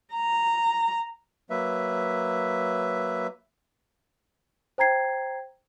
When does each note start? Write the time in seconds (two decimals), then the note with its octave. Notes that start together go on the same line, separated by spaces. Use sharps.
0.14 A#5
1.50 F#3 A#3 B4 E5
4.78 C5 G5 A#5 G#6 C7